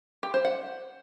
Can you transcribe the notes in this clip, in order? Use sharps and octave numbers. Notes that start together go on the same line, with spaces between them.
G4
C5
F#5